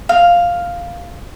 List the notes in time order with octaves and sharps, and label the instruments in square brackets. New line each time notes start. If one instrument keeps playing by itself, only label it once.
[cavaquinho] F5